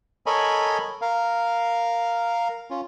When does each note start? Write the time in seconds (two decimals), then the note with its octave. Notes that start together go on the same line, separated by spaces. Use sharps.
0.26 A4 A#4 C#5 D#5 G#5 B5
1.02 A#4 F5
2.70 C#4 F4